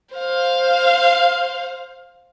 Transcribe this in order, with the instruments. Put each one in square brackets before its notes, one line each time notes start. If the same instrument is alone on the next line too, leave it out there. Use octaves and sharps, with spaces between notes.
[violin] C5 F5